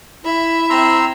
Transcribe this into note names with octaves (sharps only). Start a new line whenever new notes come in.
E4 E5 B5
C4 A#5 C6 E6